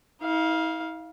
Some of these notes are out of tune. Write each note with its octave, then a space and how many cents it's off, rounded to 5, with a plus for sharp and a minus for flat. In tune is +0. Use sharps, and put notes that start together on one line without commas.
E4 -45 F5 +0